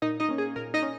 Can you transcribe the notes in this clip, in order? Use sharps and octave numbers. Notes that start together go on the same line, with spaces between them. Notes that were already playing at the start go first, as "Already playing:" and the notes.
A#2 D#4 D#5
D#4 D#5
A#3 C#4
G#4
A#2 A#4
D#4 D#5
C#4